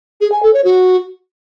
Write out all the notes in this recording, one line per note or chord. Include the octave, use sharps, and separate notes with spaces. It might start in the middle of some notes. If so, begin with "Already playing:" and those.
G#4
G#5
A4
C#5
F#4